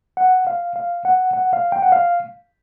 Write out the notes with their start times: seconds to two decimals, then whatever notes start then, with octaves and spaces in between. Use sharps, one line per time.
0.17 F#5
0.47 F5
0.76 F5
1.05 F#5
1.33 F#5
1.53 F5
1.72 G5
1.82 F#5
1.92 F5